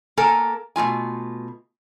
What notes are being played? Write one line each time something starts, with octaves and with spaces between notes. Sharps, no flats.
A#3 A4 A#4 G#5
B2 A3 F4 G#5